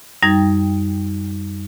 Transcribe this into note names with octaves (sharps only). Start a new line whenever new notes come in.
F#2 G3 D#4 G5 G#6 A#6